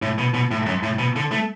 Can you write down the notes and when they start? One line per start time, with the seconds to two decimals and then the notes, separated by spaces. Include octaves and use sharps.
0.02 A2
0.18 B2
0.34 B2
0.51 A2
0.66 F#2
0.83 A2
0.99 B2
1.16 D3
1.32 A3